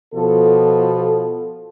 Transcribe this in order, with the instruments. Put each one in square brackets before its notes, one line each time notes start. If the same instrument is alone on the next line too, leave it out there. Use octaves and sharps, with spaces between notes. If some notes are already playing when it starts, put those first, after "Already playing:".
[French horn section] B2 F3 A4